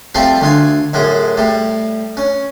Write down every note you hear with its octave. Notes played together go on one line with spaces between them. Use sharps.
F3 G3 A3 C4 F4
D2 F4 G#5
F#2 A2 G#3
A2 G3
C#4